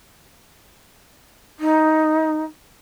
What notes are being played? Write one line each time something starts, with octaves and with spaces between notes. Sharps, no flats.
D#4